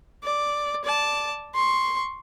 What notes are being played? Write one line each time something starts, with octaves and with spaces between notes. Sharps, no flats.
D5
D5 A5
C6 C#6